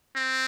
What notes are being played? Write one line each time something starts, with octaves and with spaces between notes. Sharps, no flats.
C4